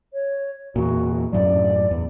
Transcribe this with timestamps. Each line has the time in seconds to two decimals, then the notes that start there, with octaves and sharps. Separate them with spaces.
0.14 C#5
0.76 E2 A#2 F#4
1.33 F#2 A2 F#3 D5
1.91 E2